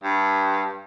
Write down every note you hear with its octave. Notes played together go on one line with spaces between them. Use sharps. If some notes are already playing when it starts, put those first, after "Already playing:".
G2